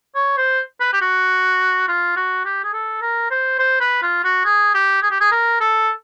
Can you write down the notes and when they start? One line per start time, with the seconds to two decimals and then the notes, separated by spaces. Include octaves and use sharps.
0.15 C#5
0.37 C5
0.80 B4
0.93 G4
1.01 F#4
1.88 F4
2.16 F#4
2.45 G4
2.64 G#4
2.73 A4
3.01 A#4
3.31 C5
3.59 C5
3.81 B4
4.03 F4
4.24 F#4
4.45 G#4
4.74 G4
5.02 G#4
5.11 G4
5.21 G#4
5.32 A#4
5.60 A4